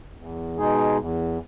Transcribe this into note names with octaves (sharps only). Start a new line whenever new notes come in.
E2
B2 G#3 D#4 G#4
E2